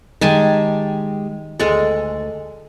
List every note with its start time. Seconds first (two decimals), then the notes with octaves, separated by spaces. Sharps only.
0.21 D#3 G#3 G4 G#5 A5
1.60 D2 G#3 A4